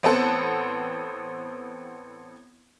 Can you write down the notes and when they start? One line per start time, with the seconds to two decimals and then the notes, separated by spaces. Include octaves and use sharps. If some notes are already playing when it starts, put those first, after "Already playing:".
0.03 A1 B3 C4 A4 F#5